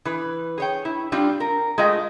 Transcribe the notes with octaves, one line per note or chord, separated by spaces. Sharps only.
E3 B4
G#4 C#5 G5
E4
G3 C4 D4 F4
A#4
G#3 A3 F4 D#5 G5